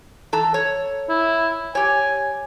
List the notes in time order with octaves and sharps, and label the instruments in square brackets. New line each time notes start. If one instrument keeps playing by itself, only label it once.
[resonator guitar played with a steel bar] E3 A4 A#5
C#5
[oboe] E4
[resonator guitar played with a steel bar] G4 C#5 [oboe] G#5